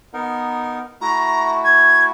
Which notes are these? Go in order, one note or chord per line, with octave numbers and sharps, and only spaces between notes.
B3 D#4 A#4
A3 E4 F#4 A#5
G#6